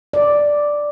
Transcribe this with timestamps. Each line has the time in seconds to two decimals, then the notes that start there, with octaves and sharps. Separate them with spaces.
0.13 D5